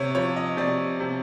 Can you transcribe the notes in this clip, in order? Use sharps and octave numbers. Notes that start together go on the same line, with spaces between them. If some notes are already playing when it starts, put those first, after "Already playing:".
Already playing: C3 C#5
F3 C#5
D#5
C3 D5
C3